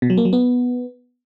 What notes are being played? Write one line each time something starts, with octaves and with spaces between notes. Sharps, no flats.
B2
F#3
A#3
F#3
B3